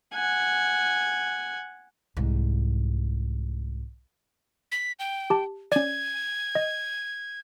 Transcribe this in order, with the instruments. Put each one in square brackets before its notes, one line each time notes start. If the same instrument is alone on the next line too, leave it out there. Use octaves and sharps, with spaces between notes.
[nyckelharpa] F#5 G#5
[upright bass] C2 G#2
[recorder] B6
G5
[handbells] G4 A5
[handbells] C#4 D5 [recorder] G#6
[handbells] D#5